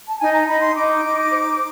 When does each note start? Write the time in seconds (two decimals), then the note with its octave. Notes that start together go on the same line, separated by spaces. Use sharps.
0.09 A5
0.19 D#4 G#5
0.33 A#5
0.47 D#4 B5
0.61 C6
0.75 D#4 D6
1.04 D#4
1.31 C5